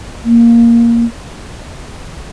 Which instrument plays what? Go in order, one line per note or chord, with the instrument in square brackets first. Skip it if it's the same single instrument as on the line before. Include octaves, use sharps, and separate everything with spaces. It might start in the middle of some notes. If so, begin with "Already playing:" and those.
[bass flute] A#3